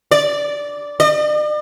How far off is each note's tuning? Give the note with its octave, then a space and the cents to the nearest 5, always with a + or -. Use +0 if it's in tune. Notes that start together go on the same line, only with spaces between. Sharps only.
D5 -10
D5 +45